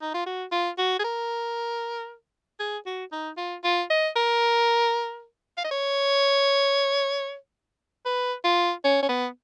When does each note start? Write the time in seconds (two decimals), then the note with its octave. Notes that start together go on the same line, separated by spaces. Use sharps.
0.02 D#4
0.14 F4
0.26 F#4
0.52 F4
0.78 F#4
0.99 G#4
1.04 A#4
2.59 G#4
2.86 F#4
3.12 D#4
3.37 F4
3.64 F4
3.90 D#5
4.16 A#4
5.57 F5
5.64 D#5
5.71 C#5
8.06 B4
8.44 F4
8.84 C#4
9.03 C#4
9.09 B3